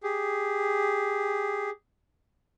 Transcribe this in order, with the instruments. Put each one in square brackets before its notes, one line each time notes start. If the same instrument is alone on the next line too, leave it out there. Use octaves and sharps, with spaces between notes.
[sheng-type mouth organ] G4 G#4